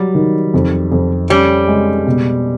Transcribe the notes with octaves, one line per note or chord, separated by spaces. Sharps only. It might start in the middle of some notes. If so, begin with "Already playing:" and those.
Already playing: F#3 G3
D#3
F2
F2
G3 C#4
G#3
B2